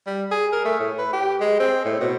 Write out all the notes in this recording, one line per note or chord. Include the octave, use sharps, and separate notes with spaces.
G3
G#4
A#4
A3
A2
B4
G4
G#3
C4
A2
B2